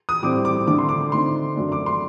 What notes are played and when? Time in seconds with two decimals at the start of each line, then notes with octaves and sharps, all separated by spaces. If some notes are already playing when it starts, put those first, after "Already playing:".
0.09 D#6
0.22 A2 G3 C4 D6
0.45 D6
0.67 D3 A3 D4 D6
0.78 C6
0.89 D6
1.12 D3 A3 C4 D#4 C6
1.56 F#2 F#3 A3 D4
1.72 D6
1.86 C6